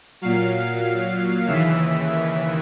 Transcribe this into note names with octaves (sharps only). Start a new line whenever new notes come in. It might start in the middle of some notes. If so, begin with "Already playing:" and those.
A#2 F#3 F5
D#2 C#3 E3 E5